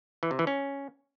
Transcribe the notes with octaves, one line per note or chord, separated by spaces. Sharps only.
E3
C3
E3
C#4